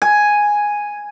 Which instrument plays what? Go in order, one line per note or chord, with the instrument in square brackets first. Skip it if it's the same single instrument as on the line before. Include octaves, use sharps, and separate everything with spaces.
[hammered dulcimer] G#5